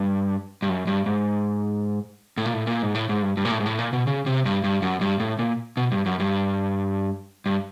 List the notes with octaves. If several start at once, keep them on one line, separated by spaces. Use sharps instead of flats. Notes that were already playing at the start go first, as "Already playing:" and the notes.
Already playing: G2
G2
F#2
G2
G#2
A2
A#2
A2
A#2
G#2
A2
G#2
G2
G2
A#2
A2
G#2
A2
A#2
B2
C#3
C3
G2
G2
F#2
G2
A2
A#2
B2
G2
F#2
G2
G2